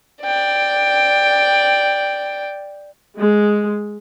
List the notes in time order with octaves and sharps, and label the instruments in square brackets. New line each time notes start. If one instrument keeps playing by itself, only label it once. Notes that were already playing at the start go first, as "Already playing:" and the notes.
[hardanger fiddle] D5 G5
[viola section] G#3